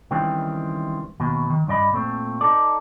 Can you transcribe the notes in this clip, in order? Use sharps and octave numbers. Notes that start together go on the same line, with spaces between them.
C#2 D#3 E3 G3 C4
D#2 B2
D#3
C#2 G2 D5 D#5 B5
A#2 A3 C4
D#4 A4 D5